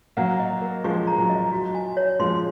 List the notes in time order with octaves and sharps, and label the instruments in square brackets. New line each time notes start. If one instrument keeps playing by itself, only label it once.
[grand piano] F#3 A#3 [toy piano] F#5
[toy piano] D#5
A#4
[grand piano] F3 G#3 [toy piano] C#6
[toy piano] A#5
[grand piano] F#3
[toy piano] D#5
F#4
G#5
C#5
[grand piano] F3 G#3 [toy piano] C6